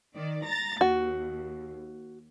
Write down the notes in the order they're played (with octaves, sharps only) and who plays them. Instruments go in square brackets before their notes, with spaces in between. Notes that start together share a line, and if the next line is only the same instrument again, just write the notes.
[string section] D#3 D5
A#5 A6
[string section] D#2 [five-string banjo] F#4